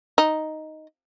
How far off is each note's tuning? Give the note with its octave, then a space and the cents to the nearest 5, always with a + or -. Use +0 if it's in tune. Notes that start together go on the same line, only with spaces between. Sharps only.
D#4 +0